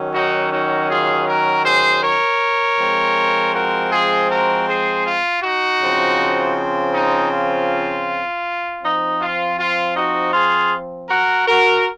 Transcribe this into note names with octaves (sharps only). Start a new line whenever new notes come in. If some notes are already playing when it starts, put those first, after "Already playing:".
Already playing: D#3 F#3 C#4
D#4 F#4
D#4 F#4
F4 G#4
F#4 A#4
G#4 C5
A#4 C#5
F3 G#3 C4
F#4 A#4
F4 G#4
F#4 A#4
G#4 C5
F4
D#4 F#4
C#3 F3 C4
D#4
F4
F3 C4 D#4
F4
F4
D#4 F#4
F4 G#4
F#4 A#4
F#4 A#4